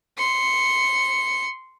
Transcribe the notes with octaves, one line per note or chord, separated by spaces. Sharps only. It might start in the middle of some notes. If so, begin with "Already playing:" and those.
C6 C#7